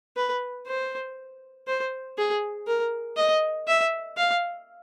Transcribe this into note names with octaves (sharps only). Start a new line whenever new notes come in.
B4
C5
C5
G#4
A#4
D#5
E5
F5